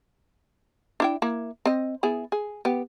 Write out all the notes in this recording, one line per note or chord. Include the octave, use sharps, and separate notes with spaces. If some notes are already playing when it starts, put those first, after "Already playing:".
D4 E4 G5
A#3 E4
C4 D#5
B3 E4 G#4
G#4
B3 G4